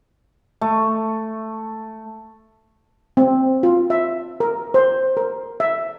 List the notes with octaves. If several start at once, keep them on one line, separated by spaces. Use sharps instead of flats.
A3
C4
F4
E5
A#4
C5
A#4
E5